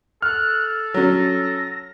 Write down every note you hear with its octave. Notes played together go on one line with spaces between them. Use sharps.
A4 F6 F#6
F#3 C#4 A#6